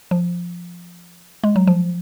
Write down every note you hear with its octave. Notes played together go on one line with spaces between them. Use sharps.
F3
G#3
F#3
F3